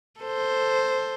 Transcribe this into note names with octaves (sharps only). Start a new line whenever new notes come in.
A4 C5